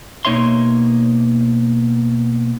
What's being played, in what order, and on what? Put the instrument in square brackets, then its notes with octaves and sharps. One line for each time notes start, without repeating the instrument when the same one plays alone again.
[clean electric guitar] B2 A#3 D#4 C#5 E5 C6